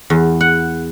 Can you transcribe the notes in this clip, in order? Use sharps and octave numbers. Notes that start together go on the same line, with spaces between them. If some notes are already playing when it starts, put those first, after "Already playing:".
E2
F#5